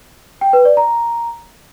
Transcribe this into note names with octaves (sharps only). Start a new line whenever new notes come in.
G5
B4
D5
A#5